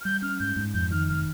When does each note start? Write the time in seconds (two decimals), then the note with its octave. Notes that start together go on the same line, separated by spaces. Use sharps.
0.01 F6
0.05 G3 G6
0.22 C#4 F6
0.40 G#2 G6
0.56 G#2
0.74 F2 G6
0.91 D#3 F6
1.08 F1 F6